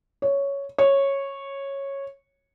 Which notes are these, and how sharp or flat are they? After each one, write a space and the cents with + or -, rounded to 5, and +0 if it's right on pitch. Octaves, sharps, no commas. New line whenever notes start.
C#5 +5
C#5 -10